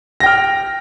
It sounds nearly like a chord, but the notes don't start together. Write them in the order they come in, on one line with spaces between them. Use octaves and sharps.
A#6 G5 F6